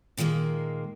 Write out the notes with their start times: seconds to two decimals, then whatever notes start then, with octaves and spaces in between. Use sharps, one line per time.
0.17 A#2 D#3 G3 G#3 A#3